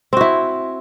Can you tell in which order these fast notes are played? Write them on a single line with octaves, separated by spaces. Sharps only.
C4 F#4 E4